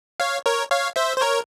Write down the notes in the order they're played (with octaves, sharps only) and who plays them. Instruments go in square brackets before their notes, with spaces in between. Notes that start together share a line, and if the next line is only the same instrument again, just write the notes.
[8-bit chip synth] C#5 F5
A#4 C#5
C#5 F5
C5 E5
C5
A#4 C#5